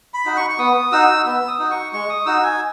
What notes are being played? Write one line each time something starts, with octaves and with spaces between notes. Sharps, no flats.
B5
D#4 F#4
C#6
C#6
B3 D#6
D#4 F#4 E6
B3 E6
D#6
D#4 F#4
C#6
G#3 C#6
D#6
D#4 F#4 E6
G#5